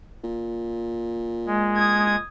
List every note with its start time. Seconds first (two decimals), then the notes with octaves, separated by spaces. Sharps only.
0.24 A#2
1.47 G#3
1.76 D#6 G#6